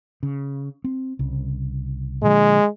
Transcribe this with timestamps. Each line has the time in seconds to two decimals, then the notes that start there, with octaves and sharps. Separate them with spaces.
0.23 C#3
0.84 C4
1.19 C2 C#3
2.23 A#2 D3 F3 G#3